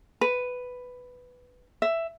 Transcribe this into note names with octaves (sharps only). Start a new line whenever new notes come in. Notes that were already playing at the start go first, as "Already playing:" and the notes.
B4
E5